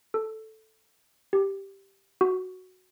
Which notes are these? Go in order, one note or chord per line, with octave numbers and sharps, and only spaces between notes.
A4
G4
F#4